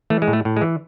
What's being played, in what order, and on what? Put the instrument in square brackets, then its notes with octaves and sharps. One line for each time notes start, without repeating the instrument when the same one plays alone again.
[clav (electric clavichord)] E3 A3
G#3
A2
A3
A2
G#3
E3